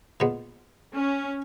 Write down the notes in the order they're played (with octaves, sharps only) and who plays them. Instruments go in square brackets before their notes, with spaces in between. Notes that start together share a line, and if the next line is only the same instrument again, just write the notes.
[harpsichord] A#2 G#3 B3
[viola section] C#4